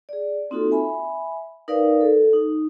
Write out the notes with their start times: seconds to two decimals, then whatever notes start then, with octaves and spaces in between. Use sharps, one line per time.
0.09 G#4 D5
0.50 A#3 C4 D#4 F4 F#4 A4
0.71 E5 G#5 B5
1.68 D#4 A#4 B4 D5 F5
2.01 A4
2.33 D#4